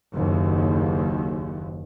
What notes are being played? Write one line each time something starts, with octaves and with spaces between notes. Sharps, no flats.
F#1 D#2